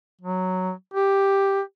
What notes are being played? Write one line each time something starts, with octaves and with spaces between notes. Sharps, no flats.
F#3
G4